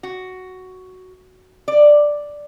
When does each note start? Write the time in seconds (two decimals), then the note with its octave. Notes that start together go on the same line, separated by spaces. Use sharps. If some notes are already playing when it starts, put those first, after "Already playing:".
0.03 F#4
1.68 D5